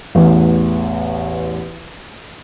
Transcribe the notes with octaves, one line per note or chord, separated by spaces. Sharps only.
A1 E2